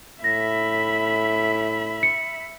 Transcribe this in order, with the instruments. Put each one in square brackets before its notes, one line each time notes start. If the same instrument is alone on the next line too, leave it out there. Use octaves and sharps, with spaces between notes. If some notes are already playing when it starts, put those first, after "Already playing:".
[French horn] A2 [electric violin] E5 B5 [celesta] A#6
[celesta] C#7